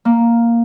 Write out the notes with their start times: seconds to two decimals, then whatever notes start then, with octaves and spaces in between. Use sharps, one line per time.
0.05 A#3